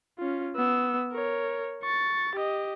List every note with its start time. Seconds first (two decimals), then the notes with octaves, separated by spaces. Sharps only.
0.19 C#4 F4
0.56 B3 E6
1.12 A#4 C#5
1.84 C#6 A6
2.35 G4 D#5